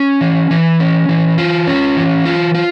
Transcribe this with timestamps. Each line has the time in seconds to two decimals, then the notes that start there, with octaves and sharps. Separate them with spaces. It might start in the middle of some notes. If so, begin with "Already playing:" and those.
Already playing: C#4
0.21 E3
0.51 E3
0.80 C#4
1.09 E3
1.38 F4
1.67 C#4
1.97 E3
2.25 F4
2.55 F4